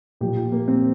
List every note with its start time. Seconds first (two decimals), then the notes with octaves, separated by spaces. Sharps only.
0.21 A#2 F3 G4
0.36 F4
0.52 A#3
0.68 C4